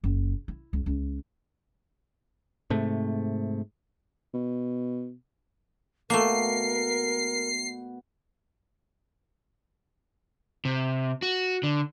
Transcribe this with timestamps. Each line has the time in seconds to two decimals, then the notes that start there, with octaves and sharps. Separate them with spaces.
0.04 F#1
0.48 E4
0.73 C#2
0.86 C#2
2.70 G#2 C3 A3
4.33 B2
6.10 B2 A3 A#3 A#4 C7
10.65 C3
11.22 F#4
11.63 D3